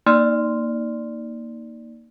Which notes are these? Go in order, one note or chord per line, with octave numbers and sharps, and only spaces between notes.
A#3 D#4 D5 C6 F6